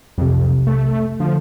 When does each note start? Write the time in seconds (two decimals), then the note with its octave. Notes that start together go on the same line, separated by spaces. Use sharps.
0.18 B1 F2 C3
0.67 A3
1.20 D3 F3